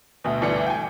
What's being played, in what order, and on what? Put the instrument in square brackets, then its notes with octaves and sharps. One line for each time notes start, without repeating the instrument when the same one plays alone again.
[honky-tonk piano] D2 B2
G1 D2 E3 D5 C#7
G5 G#5